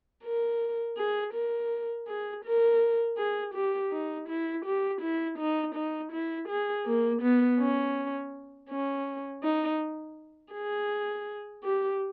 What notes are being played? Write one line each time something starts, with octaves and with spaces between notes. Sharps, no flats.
A#4
G#4
A#4
G#4
A#4
G#4
G4
D#4
E4
G4
E4
D#4
D#4
E4
G#4
A#3
B3
C#4
C#4
D#4
G#4
G4